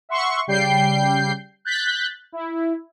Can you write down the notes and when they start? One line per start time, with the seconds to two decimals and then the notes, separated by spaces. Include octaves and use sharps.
0.09 E5 F#5 C6 C#6
0.47 C#3 G3 G5 G6 C7
1.65 F#6 G6 A6 B6
2.32 E4